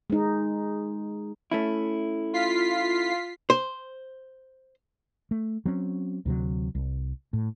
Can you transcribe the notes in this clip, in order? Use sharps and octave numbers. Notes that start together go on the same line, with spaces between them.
G#3 D#4
A3 C#4 E4
F4 B6 C7
C5
A3
F#3 C4 C#4
D2 C3 F#3
C2
A2